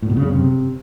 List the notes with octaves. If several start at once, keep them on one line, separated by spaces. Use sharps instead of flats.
A2
B2
C#3
F#2
C3